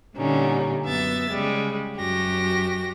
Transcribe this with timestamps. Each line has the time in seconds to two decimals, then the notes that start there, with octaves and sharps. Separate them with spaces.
0.16 A#2 D3 G3 C#4 D#4
0.85 F#2 B3 E5 A6
1.31 C#3 G3 G#3
1.97 F#2 F#4 G4 A#6